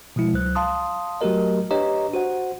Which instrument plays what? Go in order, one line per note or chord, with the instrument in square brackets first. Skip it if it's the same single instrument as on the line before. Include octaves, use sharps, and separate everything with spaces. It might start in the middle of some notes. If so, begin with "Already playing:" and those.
[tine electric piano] B2 F3 G#3 E4
C#2 F#3 C5 F#6
F5 A5 C6 D#6
F#3 A3 F#4 G4 A#4 D#5
D4 G4 B4 C#5 D#5 A#5
F#4 C5 F#5